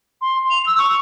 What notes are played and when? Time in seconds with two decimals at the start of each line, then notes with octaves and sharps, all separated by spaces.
0.22 C6
0.50 F7
0.66 E6
0.78 C#6